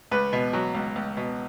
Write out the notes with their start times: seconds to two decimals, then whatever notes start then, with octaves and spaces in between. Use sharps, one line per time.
0.12 C#2 B4
0.33 B2
0.53 F#3
0.75 C#2
0.96 C#2
1.17 B2